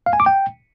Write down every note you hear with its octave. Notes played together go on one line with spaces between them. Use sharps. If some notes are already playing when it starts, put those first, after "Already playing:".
F5
G#5
D6
G5